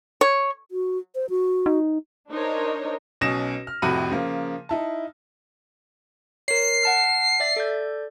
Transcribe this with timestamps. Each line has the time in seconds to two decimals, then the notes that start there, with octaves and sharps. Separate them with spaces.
0.21 C#5
0.71 F#4
1.15 C5
1.30 F#4
1.66 D#4
2.30 D4 D#4 A#4 C5 C#5 D#5
3.21 B1 B2 C#4 A#6 E7
3.67 F6
3.82 F2 A2 C3 F#4 B5 D#7
4.10 C#3 F3 A#3
4.69 D#4 E4 A5
6.48 A#4 C#5 C7
6.83 F#5 A5 F6
7.40 D5 E5 A6
7.56 A4 D5 G6